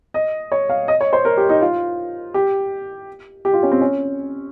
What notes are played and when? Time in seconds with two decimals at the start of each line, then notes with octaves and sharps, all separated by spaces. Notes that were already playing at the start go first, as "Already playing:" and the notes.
0.14 D#5
0.52 C#5
0.69 F5
0.88 D#5
1.01 C#5
1.13 C5
1.25 A#4
1.37 G4
1.49 D#4
1.62 F4
2.34 G4
3.45 G4
3.54 F4
3.63 C#4
3.71 C4
3.81 C#4